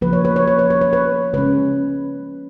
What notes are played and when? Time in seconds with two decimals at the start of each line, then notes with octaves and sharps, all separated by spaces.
0.01 C#3 F3 A#3 B4
0.13 C#5
0.25 B4
0.36 C#5
0.47 B4
0.59 C#5
0.70 B4
0.81 C#5
0.93 B4
1.34 C#3 G#3 C#4 B4